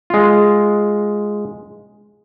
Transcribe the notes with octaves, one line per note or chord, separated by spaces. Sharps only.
G#3 F4